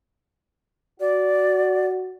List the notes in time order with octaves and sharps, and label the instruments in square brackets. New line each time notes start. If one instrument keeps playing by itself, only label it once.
[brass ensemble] F#4 [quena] D5